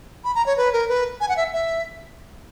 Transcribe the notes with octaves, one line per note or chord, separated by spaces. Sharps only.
B5
A#5
C#5
B4
A#4
B4
G#5
F#5
E5
E5